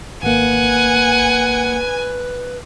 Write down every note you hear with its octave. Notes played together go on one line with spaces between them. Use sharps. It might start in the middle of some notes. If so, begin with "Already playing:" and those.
G#1 A#3 B4 F#5 G#5